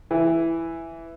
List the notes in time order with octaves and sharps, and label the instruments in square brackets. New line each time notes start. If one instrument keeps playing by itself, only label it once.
[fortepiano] E3